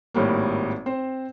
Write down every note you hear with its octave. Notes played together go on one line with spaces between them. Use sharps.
G#1 A2 G3 A#3
C4 C5